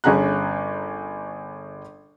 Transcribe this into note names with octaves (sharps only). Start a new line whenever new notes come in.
G1 C#4 G#4 A#5 F#6